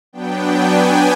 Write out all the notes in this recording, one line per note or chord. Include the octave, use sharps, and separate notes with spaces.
F#3 B3 D4 G5
G#5